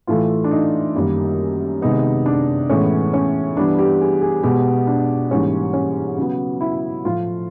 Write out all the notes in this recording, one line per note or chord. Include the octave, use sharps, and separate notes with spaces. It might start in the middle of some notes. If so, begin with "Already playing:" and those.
A2 E3 A3 F4
D4
D#4
F#2 D#3 G3 A#3
C3 D#3 G#3 B3 D#4
D4
A2 E3 G#3 B3 C#4
C#4
G2 E3 G3 B3 D4
G4
G#4
G#4
B2 G#3 B3 G4
D4
G#2 E3 G3 A#3 C#4
C#4
C#3 F#3 B3
E4
A2 F3 A3 F4